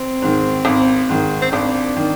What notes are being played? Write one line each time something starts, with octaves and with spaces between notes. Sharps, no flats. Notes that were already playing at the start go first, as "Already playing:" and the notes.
Already playing: C4
G#2 D#3
G#1
G#2 D#3
C4
G#1 D4
D#3